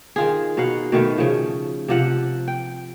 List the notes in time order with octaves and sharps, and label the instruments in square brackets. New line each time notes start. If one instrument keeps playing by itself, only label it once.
[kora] D#3 F4 G#4
B2 D#4 F5 F#5
B2 D#3 A3
C#3 F3
C3 F3 F#5
G5